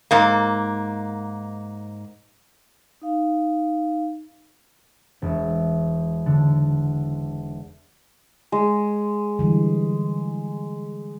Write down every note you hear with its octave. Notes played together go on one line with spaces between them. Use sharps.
G#2 A#3
D#4 F5
E1
D3
G#3
D3 E3 G3